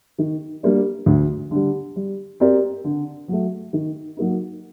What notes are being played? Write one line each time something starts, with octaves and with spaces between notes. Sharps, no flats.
D#3
G3 A#3 D4
D2
D3 G3
G3
C4 G4 A#4 D5
D3
F#3 A3
D#3
F#3 A#3 D#4